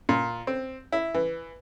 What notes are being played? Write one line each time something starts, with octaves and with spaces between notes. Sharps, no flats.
A#2
C4
E4
E3